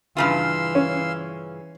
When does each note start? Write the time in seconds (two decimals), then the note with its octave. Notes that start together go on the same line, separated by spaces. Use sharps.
0.17 G2 C#3 E3 F4 F5 C6 E6
0.75 C#4